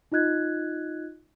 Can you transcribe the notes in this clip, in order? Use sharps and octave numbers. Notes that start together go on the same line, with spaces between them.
D#4 F4 D#5 F#6 G#6